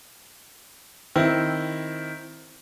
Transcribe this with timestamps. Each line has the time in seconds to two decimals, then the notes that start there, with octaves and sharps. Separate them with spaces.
1.16 D#3 C4 E4